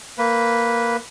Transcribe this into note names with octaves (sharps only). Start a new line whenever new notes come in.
A#3 B4